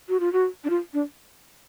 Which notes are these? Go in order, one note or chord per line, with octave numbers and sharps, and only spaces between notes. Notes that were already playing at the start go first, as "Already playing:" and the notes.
F#4
F4
F#4
D4
F4
D4